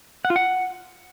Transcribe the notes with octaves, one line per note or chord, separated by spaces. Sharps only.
F#5
F4
F#5